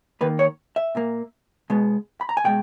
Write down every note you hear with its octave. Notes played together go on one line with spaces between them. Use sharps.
D#3 A#3 B4
C#5
E5
A#2 A#3
B2 G#3 B3
B5
A#5
G#5
B2 G#3 G5